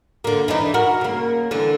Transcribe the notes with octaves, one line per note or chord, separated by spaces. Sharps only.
D3 A#3
E3 D4 D#4
F#4 A#4
C#3 A#3
D3 E3